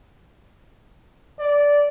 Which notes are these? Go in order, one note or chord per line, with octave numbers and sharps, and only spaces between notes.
D5